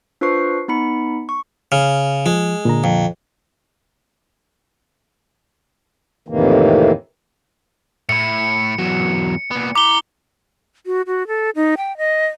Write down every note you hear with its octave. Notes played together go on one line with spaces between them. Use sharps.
D4 F4 B4 C5 C#6 C7
B3 D#4 B5 C#7
C#6
C#3 F6
F3 G#3
A#2 D3 A#5
F2
F2 A2 C3 D#3 E3 A#3
A2 E4 C#7
E2 F#3
A#2 B3
E4 A#5 D6 G7
F#4
F#4
A4
D#4
G5
D#5